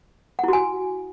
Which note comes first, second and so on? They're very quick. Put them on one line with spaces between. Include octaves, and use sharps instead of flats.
F#5 E4 F#4 G#5